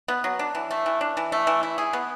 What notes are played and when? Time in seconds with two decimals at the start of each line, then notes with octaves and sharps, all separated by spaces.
0.08 B3
0.24 F#3
0.39 D4
0.55 E3
0.71 A3
0.86 E3
1.01 D4
1.17 E3
1.32 A3
1.47 E3
1.63 E4
1.78 G#4
1.93 B3